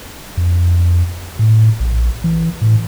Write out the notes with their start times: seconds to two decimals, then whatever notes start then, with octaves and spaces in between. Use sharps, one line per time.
0.37 F2
1.39 A2
1.80 A#1
2.24 E3
2.61 A2